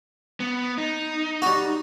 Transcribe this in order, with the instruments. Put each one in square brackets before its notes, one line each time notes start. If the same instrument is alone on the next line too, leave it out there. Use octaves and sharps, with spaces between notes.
[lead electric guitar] B3
D#4
[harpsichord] G3 F#4